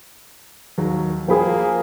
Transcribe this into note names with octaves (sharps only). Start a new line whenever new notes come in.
D#2 D#3 F#3
F3 A#3 G#4 G5 B5